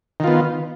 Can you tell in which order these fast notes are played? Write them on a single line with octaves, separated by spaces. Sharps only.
D#3 F4 B3